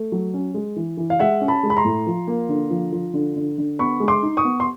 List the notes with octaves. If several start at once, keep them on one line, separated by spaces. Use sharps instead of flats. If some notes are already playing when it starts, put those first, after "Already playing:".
Already playing: A3
F#3
C#4
G#3
E3
E3
F5
G#3 E5 F#5
C#4
A5 B5
G#3
B5
A#5 C6
A2
F3
A#3
D3
F3
F3
D3
D3
D3
B3 B5 C#6
G#3
C6 D6
D#4
C#6 D#6
B3
C6